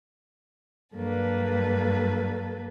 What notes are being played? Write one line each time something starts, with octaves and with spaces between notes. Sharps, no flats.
G2 F#3 A#3 A4 B4